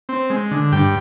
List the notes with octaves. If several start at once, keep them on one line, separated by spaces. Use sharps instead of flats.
C4
G#3
D3
G2 G5